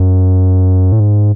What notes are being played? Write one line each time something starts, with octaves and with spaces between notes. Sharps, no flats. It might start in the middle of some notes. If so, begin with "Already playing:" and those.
Already playing: F#2
A2
G#2